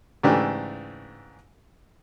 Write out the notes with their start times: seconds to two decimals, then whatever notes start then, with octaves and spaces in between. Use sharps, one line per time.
0.23 G#2 C#3 E3 A3 D4 G4